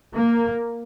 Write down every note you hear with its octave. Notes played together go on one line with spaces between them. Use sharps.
A#3